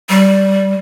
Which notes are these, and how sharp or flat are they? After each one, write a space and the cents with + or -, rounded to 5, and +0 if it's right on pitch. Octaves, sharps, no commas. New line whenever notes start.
G3 -15